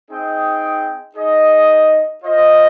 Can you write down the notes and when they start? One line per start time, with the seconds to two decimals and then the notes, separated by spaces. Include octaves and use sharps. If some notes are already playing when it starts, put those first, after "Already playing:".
0.10 C4 D#4 G#4 D#5 G5
1.16 D#4 G#4 D#5
2.23 F4 C5 D#5